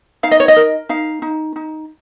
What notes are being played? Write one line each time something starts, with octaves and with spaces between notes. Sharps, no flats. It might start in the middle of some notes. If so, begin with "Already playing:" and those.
D#4 F5
D#5
C#5
D#5
A#4
D#4 F5
D#4
D#4